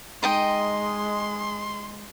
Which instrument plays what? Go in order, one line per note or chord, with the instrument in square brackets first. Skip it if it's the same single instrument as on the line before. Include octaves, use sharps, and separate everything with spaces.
[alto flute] G#3 [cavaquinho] D#4 D#5 G5 [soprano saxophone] C6